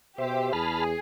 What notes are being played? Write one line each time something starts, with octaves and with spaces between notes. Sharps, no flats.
B2 G4 C5 E5
E2 G#4 A5 B5 F6